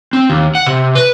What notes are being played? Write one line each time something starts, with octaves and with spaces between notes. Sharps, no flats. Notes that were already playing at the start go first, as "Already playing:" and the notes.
C4
D#2
F#5
C3
B4